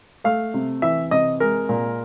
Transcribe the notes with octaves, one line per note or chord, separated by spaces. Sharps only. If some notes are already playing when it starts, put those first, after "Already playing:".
A3 F5
C3
E3 E5
C3 D#5
G#3 A#4
A#2